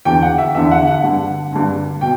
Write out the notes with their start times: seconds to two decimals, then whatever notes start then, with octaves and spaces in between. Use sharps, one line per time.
0.05 E2 D3 G5
0.22 F#5
0.38 E5
0.55 E2 D3 E5
0.71 F#5
0.87 F#5
1.04 G2 D3
1.52 G2 D3
2.01 B2 G5